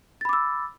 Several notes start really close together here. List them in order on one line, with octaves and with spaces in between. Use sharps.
A6 B5 D6 E6